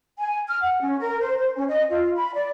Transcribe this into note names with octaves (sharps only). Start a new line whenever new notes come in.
G#5
F6
F#5
C#4
A#4
C5
C5
C#4
D#5
F4
B5
D5